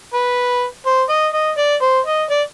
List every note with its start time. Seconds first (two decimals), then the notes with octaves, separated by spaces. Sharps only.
0.14 B4
0.86 C5
1.10 D#5
1.34 D#5
1.58 D5
1.82 C5
2.06 D#5
2.30 D5